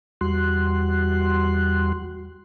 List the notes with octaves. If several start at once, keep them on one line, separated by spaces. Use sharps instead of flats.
E2 G3 F#4 C6 F#6